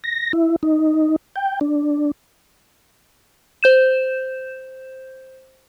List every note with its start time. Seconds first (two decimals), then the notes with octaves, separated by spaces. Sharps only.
0.04 A#6
0.33 E4
0.63 D#4
1.36 G5
1.61 D4
3.63 C5 G6 E7